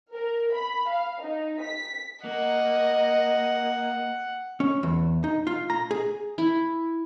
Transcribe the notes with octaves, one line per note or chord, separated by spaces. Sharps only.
A#4
B5
F5
D#4
B6
A#3 D#5 F#5
C#4
E2
D#4
F4
A#5
G#4
E4